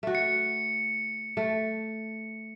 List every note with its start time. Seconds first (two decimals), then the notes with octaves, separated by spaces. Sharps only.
0.03 A3 F#4
0.15 C#7
1.37 A3